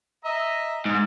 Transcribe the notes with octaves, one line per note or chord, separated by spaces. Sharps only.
D#5 E5 A#5
G#2